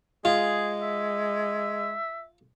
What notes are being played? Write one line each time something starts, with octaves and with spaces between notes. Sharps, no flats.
G#3 F4 G#4
E5